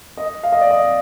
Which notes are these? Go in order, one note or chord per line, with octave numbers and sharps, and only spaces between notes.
D#5
F5
D#5
D5
D#5